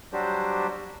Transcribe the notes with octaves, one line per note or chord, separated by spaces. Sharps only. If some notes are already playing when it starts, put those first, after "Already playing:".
F#3 G3 D4 F#4 G4 C5